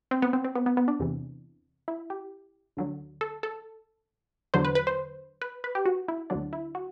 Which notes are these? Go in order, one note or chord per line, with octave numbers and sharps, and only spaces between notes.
C4
B3
C4
C4
B3
B3
B3
D4
E2 C3 E3
E4
G4
D2 D3 F#3
A4
A4
E2 D3 F#3 C5
B4
B4
C5
B4
B4
G4
F#4
E4
D2 D3 F#3 D4
E4
F#4